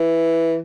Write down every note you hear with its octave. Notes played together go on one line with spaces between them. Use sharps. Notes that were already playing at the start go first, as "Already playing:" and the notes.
Already playing: E3